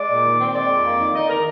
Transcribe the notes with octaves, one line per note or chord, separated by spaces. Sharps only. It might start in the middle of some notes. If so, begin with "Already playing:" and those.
Already playing: G#3 D5
A#2
D#3
C4
G#3 D5
F2
A#3
D#3
D#4 D#5
D#3 A#4